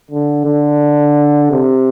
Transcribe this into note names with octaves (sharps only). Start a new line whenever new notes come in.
D3
D3
C3